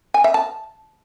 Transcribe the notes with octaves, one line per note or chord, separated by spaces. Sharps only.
G#5
E5
A5